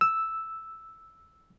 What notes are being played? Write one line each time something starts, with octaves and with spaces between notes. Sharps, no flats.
E6